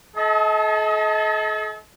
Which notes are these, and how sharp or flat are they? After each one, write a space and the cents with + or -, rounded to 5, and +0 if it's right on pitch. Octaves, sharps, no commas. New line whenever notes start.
A4 -45 D#5 +35 A5 +0